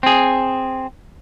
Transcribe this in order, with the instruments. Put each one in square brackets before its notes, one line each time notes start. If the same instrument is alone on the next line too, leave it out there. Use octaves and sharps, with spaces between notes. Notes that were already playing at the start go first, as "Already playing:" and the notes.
[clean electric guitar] C4 G#4